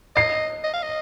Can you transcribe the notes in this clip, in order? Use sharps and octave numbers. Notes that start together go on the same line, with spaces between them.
D#5 C7
D#5
F5
D#5